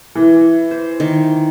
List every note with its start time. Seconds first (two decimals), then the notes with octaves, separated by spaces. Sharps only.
0.15 E3
0.71 C5
1.00 D#3